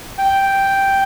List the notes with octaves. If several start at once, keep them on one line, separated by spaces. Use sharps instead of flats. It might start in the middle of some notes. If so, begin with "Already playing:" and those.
G5